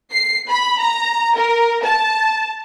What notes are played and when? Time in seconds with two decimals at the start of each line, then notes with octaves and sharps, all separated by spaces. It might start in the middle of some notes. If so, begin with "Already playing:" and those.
0.13 C7
0.49 B5
0.80 A#5
1.38 A#4
1.85 A5